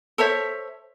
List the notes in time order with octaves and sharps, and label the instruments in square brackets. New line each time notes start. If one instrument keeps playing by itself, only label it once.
[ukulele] A4 C5 C#5 E5